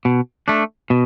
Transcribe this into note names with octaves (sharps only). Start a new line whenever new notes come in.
B2
A3 D4
B2